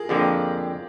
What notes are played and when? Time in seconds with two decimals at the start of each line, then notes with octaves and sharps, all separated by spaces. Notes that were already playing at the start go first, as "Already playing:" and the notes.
Already playing: F4 G#4 A#4
0.09 F2 D3 F3 A#3 G4